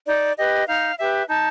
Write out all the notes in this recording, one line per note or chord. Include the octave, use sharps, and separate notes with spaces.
D#4 D5
G4 B4 D#5
D#4 F5
G4 B4 E5
D#4 A5